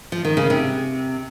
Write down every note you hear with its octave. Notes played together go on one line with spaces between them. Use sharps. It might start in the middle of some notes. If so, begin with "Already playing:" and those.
F3
D#3
C#3
C3